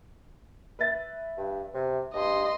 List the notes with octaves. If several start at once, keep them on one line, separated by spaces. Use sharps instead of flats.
B4 E5 A6
G2
C3
G2 D#5 C6